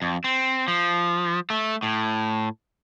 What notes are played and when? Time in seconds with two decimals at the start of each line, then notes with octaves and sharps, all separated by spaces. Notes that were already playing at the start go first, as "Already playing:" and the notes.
0.02 F2
0.24 C4
0.68 F3
1.50 A3
1.83 A2